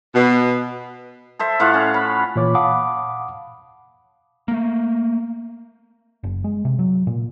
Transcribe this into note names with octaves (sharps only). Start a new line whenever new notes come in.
B2
A4 C5 E5
A2 F4 C5 F#5
C#4
B5
A#2 E3 C#5 D6
F5 F#5 A5 B5 D6 D#6
A3 A#3
F#1
G#3
C3
F#3
A#2